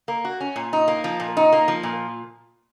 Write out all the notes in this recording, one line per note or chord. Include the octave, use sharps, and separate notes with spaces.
A#3
F#4
C#4
A#2
D#4
A#3
F3
A#2
D#4
A#3
F3
A#2